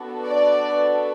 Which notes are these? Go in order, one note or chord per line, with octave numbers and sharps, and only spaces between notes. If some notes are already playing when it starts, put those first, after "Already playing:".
Already playing: B3 D4 F#4 A4
D5